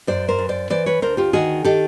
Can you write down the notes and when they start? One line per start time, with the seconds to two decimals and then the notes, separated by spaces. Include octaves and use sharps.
0.07 F#2 C5 D5
0.28 A#4 C5
0.38 F#2
0.49 C5 D5
0.70 E3 C5 D5
0.86 B4 C#5
1.02 D2 A#4 C5
1.17 F4 G4
1.33 D#3 F#4 G#4
1.64 D#3 G4 A4